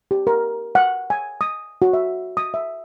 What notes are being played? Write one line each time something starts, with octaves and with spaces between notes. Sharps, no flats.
G4
A#4
F#5
G#5
D#6
F#4
E5
D#6
E5